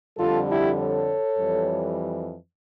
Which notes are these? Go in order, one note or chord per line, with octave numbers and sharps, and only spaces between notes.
F2 D3 G3 F4 A4
E4 G4
A4 C#5
F2 E3 G3